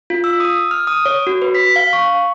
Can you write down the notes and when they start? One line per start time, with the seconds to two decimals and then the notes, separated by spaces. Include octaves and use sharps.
0.10 F4
0.24 E6
0.40 D#6
0.71 F6
0.87 D#6
1.06 C#5
1.27 F#4
1.42 B4
1.55 B6
1.76 F5
1.93 C#6